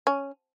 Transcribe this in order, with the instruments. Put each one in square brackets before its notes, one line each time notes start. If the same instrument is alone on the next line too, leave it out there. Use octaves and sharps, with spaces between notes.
[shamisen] C#4